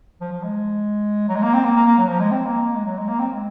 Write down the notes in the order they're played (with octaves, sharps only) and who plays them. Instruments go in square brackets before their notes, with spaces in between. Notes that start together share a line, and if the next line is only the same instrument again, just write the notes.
[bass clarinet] F3
F3
G#3
F#3
G#3
A#3
C4
A#3
A#3
A#3
F#3
F3
G#3
C4
A#3
A#3
G#3
F#3
G#3
A#3
C4
G#3